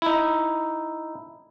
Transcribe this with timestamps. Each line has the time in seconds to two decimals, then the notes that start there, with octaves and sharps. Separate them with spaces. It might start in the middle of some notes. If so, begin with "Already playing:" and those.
0.02 D#4 E4